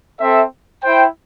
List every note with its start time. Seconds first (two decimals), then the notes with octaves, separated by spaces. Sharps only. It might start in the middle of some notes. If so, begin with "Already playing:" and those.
0.20 C4 A4 E5
0.83 E4 C5 G5